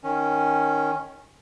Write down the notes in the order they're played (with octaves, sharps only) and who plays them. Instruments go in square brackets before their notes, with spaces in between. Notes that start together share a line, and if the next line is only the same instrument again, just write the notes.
[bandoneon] D#3 C#4